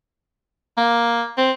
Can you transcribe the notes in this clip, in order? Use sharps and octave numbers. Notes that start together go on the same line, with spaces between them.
A#3
C4